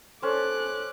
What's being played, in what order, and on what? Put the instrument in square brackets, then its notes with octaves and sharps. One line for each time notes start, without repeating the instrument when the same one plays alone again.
[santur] C#4 C5 [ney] A4 [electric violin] D6 F#6